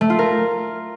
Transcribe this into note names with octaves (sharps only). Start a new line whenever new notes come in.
A3
F4
A#4